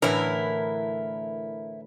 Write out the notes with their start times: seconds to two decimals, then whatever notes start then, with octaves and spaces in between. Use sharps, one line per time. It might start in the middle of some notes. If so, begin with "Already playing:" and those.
0.02 A2 D3 E3 E4 A#4